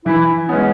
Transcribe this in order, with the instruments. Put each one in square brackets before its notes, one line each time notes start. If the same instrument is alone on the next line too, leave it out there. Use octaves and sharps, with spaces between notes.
[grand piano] E3 [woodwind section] E4
[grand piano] G#3 B3 [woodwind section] C#4